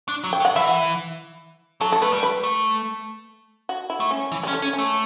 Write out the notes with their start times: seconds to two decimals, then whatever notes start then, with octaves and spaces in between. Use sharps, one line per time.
0.08 D4
0.24 F#3
0.33 G5
0.40 F#3
0.45 F#5
0.56 E3 E5
1.81 F#3 A4
1.92 A4
2.02 A3 B4
2.13 G3
2.23 B4
2.43 A3
3.69 F#4
3.90 E4
4.00 A3
4.10 C#4
4.32 E3
4.43 G3
4.48 C#4
4.53 A3
4.62 C#4
4.73 C#4
4.78 A3